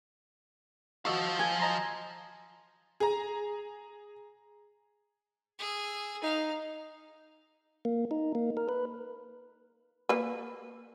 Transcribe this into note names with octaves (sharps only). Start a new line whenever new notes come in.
F3 F#4 D#5 F5 C#6 E6
G#5
D#5 A#5 C6
G#4 A#5
G#4 E6
D#4 F5
A#3
D#4
A#3
A#4
B4
A#3 B4